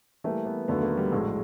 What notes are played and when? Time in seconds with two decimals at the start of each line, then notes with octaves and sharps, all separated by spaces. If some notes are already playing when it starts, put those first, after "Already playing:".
0.24 E3 G3 A3 A#3
0.46 B3
0.68 D#2 D3 F#3 A3 B3
0.83 A#3
0.97 G3
1.12 A#1 A2 F#3 G#3